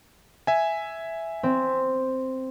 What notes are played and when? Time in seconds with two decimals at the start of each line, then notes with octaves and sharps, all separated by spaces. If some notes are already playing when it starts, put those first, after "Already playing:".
0.47 E5 G#5
1.43 C4